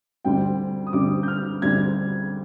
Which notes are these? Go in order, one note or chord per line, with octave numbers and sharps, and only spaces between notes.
D2 D3 G3 C4 G5
D#6
D2 D3 G3 C4 D6
G6
F6
D2 D3 G3 C4 G#6